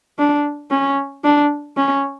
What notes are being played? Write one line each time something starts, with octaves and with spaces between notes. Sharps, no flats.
D4
C#4
D4
C#4